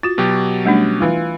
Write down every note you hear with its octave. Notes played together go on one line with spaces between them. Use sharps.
F4 F#4 A6
B2 F#3 G4
G3 A3 C#4 D4
E3 F4